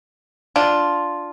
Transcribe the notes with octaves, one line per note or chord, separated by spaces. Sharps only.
D4 F4